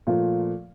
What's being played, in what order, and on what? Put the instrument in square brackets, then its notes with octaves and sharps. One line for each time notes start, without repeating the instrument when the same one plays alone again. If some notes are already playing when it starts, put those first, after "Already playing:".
[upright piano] A#2 F3 A3 F4